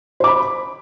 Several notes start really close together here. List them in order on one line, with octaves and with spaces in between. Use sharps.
C5 D6 B5